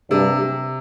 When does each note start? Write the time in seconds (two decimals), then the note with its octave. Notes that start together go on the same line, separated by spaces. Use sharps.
0.10 G2 C3
0.41 C3